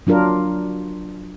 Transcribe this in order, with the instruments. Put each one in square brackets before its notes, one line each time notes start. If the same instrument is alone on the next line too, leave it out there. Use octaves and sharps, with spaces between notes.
[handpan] F#3 D4 F4 A#4